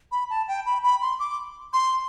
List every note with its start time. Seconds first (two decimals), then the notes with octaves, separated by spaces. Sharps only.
0.12 B5
0.30 A5
0.48 G5
0.66 B5
0.83 B5
1.02 C6
1.19 D6
1.73 C6